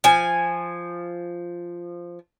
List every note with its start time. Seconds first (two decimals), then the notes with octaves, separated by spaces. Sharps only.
0.04 F3 G#5